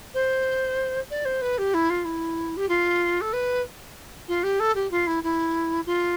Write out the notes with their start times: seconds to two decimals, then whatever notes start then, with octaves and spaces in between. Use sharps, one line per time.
0.14 C5
1.10 D5
1.25 C5
1.41 B4
1.58 G4
1.74 E4
1.89 F4
2.04 E4
2.56 G4
2.68 F4
3.21 A4
3.32 B4
4.28 F4
4.43 G4
4.59 A4
4.75 G4
4.90 F4
5.06 E4
5.23 E4
5.86 F4